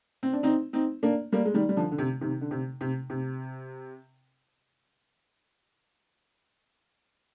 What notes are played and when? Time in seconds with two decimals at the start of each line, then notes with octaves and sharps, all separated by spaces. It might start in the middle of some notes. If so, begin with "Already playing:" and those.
0.23 C4
0.33 D4
0.43 C4 D#4
0.73 C4 D#4
1.03 A#3 D4
1.32 G3 A#3
1.45 G#3
1.54 D#3 G3
1.69 G3
1.77 D3 F3
1.92 D3
1.99 C3
2.21 C3 D#3
2.41 D3
2.51 C3
2.81 C3
3.10 C3